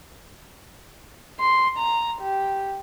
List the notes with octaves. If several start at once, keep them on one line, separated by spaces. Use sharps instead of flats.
C6
A#5
G4